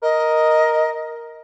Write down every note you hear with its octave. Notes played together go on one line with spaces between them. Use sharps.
A#4 D#5